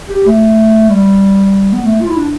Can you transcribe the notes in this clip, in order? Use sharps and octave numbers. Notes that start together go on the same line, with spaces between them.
G4
A3
G3
B3
A3
F4
E4
D4